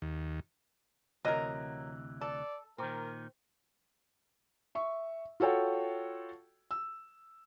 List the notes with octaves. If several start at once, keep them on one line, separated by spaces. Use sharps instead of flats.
D#2
D2 C3 E3 F#3 A#4 D#5
A4 D5
A#2 D#3 C4 A#4
E5 C#6
F4 F#4 A4 C#5 G5
E6